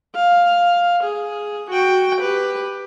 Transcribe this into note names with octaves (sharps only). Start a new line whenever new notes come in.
F5
G#4
F#4 G5
G4 B4